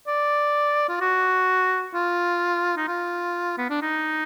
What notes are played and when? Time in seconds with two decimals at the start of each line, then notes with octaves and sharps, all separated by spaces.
0.07 D5
0.89 F4
1.01 F#4
1.94 F4
2.77 D#4
2.87 F4
3.58 B3
3.70 D4
3.81 D#4